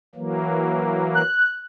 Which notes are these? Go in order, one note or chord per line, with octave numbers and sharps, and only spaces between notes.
E3 F#3 A#3
F#6